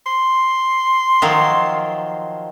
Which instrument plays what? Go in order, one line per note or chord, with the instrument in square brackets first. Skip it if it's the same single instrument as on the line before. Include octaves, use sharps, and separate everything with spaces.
[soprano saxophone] C6
[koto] D#3 F3 F#3